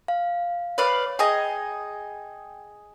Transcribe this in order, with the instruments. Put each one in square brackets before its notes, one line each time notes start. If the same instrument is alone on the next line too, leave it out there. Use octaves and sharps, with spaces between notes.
[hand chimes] F5
[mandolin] B4 D5 F5 [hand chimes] C#5
[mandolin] G#4 D#5 A#5 [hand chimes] G5